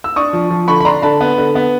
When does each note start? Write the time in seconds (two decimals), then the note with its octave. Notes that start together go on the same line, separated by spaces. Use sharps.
0.04 E6
0.16 D4 C#6 D#6
0.33 F3
0.50 F3
0.68 D3 B5 C#6
0.81 B5
0.85 D4 A#5 C6
1.02 D3 A5 B5
1.21 B3
1.38 D3
1.55 B3